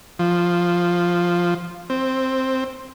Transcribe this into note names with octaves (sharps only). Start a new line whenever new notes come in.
F3
C4